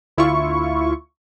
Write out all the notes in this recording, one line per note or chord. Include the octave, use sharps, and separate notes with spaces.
D2 E4 F4 C#6